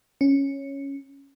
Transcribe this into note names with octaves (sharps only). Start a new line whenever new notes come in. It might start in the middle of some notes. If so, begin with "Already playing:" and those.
C#4